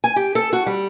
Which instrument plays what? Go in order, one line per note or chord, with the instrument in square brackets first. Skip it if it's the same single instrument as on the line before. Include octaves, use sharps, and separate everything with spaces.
[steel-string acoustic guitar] G#5
G4
A4
F#4
G3